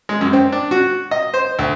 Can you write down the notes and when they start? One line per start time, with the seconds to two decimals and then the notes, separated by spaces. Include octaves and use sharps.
0.09 G#3
0.21 F#2
0.33 C4
0.52 D4
0.71 F#4
1.11 D#5
1.34 C5
1.59 D2